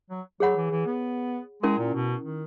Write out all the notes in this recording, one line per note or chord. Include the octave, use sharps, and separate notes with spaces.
F#3
F#3 G#4 C#5 F#5 B5
E3
E3
B3
G#3 C#4 E4 A#4
A#2
B2
D#3